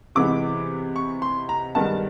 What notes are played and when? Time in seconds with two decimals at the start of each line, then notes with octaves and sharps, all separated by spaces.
0.15 C3 E3 G#3 B3 D6
0.96 C#6
1.22 C6
1.49 A#5
1.75 G2 D#3 G#3 B3 A5